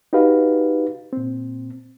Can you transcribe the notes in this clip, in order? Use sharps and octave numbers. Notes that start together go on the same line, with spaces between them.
D#4 F#4 G4 B4 F5
A#2 C4